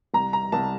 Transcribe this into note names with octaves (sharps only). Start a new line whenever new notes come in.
C2 A#5
A#5
C2 A5